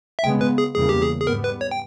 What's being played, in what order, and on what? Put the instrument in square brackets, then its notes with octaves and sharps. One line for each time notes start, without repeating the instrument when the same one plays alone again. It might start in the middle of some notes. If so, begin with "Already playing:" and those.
[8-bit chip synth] E5
[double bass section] C#3 G#3 B3 [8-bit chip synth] G5
[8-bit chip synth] B4
G#4
[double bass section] E2 C#3 E3 G3 A#3 [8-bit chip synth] G#4
[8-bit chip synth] G4
G#4
G#4
[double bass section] G#2 G3 B3 [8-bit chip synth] A#4
[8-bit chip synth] B4
C#5
G5